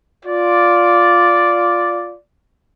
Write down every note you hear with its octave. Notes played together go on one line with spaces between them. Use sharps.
F4 D5